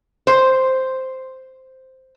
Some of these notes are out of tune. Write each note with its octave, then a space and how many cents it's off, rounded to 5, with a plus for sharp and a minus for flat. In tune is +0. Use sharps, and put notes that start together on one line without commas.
C5 -5